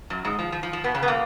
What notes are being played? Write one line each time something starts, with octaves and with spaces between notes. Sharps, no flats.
F#2 F#3
G#2 G#3
F3
F3
F3
F3
B2 B3
C#3 C#4
B3
A#2 A#3